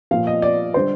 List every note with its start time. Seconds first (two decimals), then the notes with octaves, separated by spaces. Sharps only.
0.11 A#2 F3 F5
0.27 D#5
0.42 D5
0.74 D3 G3 C5